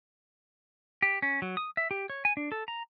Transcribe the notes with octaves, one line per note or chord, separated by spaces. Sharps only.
G4
C#4
F#3
D#6
E5
G4
C#5
G#5
D4
A4
A#5